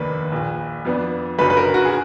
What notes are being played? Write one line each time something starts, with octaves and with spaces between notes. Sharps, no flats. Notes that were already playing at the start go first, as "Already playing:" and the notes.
Already playing: F1 D#2 D#3 A#3 D4 B4
A#1 A#2 F3
F2 F3 B3 D4
F#1 F#2 D3 F#3 B4
B4
A#4
F#4
G#4